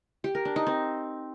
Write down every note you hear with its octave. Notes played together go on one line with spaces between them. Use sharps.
G4
A#4
D4
D#4
C4